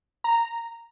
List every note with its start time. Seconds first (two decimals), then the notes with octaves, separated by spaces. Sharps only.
0.24 A#5